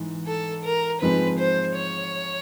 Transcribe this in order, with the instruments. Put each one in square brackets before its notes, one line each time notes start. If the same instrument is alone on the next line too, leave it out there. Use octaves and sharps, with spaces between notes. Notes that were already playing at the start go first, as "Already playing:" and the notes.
Already playing: [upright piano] G#2 E3
[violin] A4
A#4
[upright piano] G#2 F3 G#3 C4 [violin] B4
[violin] C5
C#5